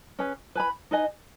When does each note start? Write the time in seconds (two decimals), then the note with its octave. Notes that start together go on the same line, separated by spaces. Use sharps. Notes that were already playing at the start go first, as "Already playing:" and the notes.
0.19 C#4 G#4 B4 G#5
0.55 B4 G#5 B5
0.91 D#4 B4 D#5 G#5